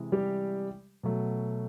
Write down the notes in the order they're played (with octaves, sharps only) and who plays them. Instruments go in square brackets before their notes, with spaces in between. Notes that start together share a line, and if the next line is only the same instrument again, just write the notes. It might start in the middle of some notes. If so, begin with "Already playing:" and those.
Already playing: [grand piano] C3 E3 G#3
G3 G4
B2 F#3 A3